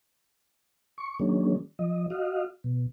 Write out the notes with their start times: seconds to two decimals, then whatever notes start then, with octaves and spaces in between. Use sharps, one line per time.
0.98 C#6
1.19 D#3 F#3 G#3 A#3 C#4 D4
1.79 F3 D#5
2.10 F#4 D#5 F5
2.64 B2